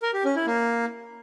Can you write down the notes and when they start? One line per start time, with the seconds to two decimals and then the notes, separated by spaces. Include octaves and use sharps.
0.02 A#4
0.14 G4
0.25 C#4
0.36 E4
0.47 A#3